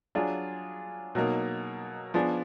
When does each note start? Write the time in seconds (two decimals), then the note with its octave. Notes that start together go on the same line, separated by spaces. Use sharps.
0.15 F#3 D4 F4 G#4
1.15 B2 F#3 A#3 D#4
2.14 F3 B3 D4 G#4